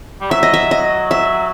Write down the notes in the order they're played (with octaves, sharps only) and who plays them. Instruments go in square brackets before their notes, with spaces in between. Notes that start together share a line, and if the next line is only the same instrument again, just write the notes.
[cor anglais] G3
[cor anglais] F#3 [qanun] E5
[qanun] D#5
E5
D#5
E5